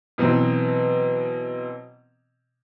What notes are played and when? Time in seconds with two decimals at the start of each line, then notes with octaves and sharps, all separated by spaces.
0.18 B2 E3 F#3 C4